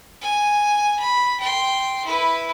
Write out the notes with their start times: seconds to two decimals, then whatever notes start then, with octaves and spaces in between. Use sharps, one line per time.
0.21 G#5
0.99 B5
1.39 G5 C6
2.05 E4 B4